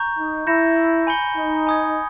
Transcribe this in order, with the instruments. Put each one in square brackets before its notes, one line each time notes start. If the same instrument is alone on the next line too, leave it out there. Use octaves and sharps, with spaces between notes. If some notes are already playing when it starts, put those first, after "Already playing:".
Already playing: [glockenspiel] A#5 C#6 G6
[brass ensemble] D#4
[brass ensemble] E4 [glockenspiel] B5 G6 A#6 C#7 E7
[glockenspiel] G#5 B5 G6 C#7 G7
[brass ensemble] D#4
[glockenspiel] G#5 D#6 G#6